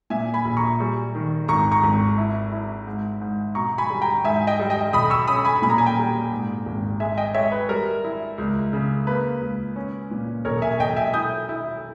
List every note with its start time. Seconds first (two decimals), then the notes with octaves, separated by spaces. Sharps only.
0.10 A#2 E5 G#5
0.34 G#5 B5
0.45 A#1
0.57 A#5 C#6
0.80 G3
1.15 D#3
1.48 G#1 A#5 C#6
1.72 A#5 C#6
1.84 G#1
2.18 E4
2.52 E4
2.87 G#2
3.21 G#2
3.55 B2 A#5 C#6
3.78 G#5 B5
3.90 G3
4.01 G5 A#5
4.24 G#2 E5 G#5
4.47 D#5 G5
4.60 G3
4.70 D#5 G5
4.93 B1 B5 D#6
5.10 C#6 E6
5.27 C#4 B5 D#6
5.45 G#5 B5
5.62 A#2 B5
5.70 A#5
5.78 G#5
5.86 G5 A#5
5.97 G3
6.32 G#2
6.66 G#1
7.00 G#3 E5 G#5
7.17 D#5 G5
7.34 G#3 C#5 E5
7.52 B4
7.69 G3 A#4
8.04 E4
8.38 C#2
8.73 C#3
9.07 A#3 B4
9.41 C#2
9.76 C#4
10.11 A#2
10.45 B1 A#4 C#5
10.62 E5 G#5
10.79 B1 D#5 G5
10.96 E5 G#5
11.14 E4 D#6 G6
11.49 E4